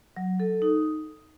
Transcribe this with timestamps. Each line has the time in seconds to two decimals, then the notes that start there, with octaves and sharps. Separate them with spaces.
0.17 F#3
0.40 A4
0.62 D#4